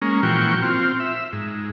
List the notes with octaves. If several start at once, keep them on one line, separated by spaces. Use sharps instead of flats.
G#3 A#3 C#4
A#2 E3 F3 F#4 G5 C#6
C4 F4
E5
G#2